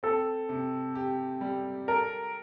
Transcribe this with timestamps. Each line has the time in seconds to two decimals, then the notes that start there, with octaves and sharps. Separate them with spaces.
0.03 C4 A4
0.49 C3
0.95 G4
1.41 G3
1.88 A4 A#4